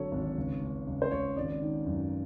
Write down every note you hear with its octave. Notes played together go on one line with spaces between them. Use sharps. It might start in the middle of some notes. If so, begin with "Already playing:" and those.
Already playing: G#1 D3 F#3 A4 C#5
G#1
C#2
C#2
C#2
C5
C#2 C#5
G#1 D5
D#3
F#2